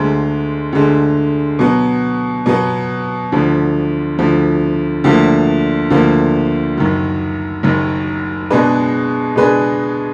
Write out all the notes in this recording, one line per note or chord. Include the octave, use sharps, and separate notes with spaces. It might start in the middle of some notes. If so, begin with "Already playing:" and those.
Already playing: D2 D3 G#3
D2 D3 G#3
B2 F#3 B3
B2 F#3 B3
D2 D3 F3
D2 D3 F3
D2 D3 F3 A#3
D2 D3 F3 A#3
F#1 F#2 D#3 F#3
F#1 F#2 D#3 F#3
B2 G#3 D4 G#4 B4
B2 G#3 D4 G#4 B4